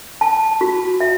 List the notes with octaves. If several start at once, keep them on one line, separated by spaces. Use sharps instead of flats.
A5
F#4
E5